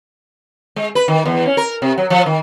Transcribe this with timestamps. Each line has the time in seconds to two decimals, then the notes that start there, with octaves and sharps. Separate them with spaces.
0.76 G#3
0.95 B4
1.08 D#3
1.25 E2
1.46 C#4
1.57 A#4
1.82 C3
1.98 F#3
2.10 F3
2.26 D#3